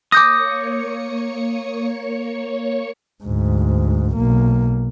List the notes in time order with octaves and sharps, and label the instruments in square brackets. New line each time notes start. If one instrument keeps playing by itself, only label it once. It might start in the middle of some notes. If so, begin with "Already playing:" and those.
[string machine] A#3 C#5 C#7 [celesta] D6 G6 A#6 [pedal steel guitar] D#6
[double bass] D2 G#2
B1 A#3